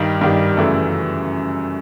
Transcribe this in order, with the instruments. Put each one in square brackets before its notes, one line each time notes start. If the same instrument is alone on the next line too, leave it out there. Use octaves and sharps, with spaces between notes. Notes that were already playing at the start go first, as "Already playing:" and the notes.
Already playing: [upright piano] G2 D#3 G3
G2 D#3 G3
F#2 C#3 E3 A3